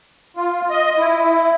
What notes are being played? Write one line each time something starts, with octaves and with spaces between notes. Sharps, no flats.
F4
D#5
E4